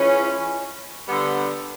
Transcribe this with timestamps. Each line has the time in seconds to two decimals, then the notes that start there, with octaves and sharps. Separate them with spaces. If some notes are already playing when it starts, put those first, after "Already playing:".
Already playing: E3 G#3 C#4 F4
1.05 D3 G3 B3